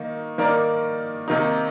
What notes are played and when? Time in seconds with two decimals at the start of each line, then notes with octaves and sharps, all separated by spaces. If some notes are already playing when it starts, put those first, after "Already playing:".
Already playing: D#3 A#3 D#4
0.38 D#3 A#3 D#4 A#4 D5
1.28 C3 D#3 A#3 D#4